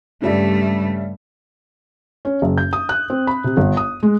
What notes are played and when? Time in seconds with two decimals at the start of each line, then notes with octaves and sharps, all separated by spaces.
0.22 G2 C#3 G3 A3 E5
2.25 C#4
2.42 F#1
2.58 G6
2.73 D#6
2.89 F#6
3.10 C4
3.27 B5
3.44 C3
3.57 G1
3.77 D#6
4.03 G#3